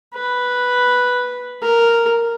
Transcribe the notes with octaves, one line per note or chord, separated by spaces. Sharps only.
B4
A#4